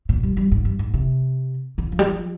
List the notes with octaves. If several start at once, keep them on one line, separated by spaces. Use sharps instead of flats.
A#2
G3
G3
G#2
G2
G#2
C3
D3
F3
G3
F3